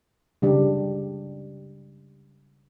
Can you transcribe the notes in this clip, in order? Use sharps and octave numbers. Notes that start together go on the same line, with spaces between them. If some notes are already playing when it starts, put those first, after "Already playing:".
C#3 G3 D4 G4